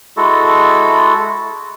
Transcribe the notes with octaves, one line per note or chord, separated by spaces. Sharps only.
G#3 E4 F#4 A4